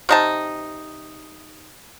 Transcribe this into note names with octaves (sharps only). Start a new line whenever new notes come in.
C3 D#4 A5